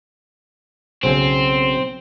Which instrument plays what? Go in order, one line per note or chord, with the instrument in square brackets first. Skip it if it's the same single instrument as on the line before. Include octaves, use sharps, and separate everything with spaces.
[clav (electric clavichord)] B1 C#3 G#5 [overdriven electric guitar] C4 [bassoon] C5